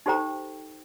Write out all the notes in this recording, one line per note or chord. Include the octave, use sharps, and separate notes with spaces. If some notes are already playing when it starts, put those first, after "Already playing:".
D#4 G4 A4 C5 G5 A#5